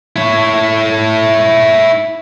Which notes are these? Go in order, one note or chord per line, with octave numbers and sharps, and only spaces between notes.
E4 C#5